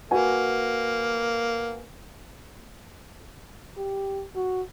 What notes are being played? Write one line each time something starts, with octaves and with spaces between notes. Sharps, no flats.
A#3 F#4 B4 G#5
G4
F#4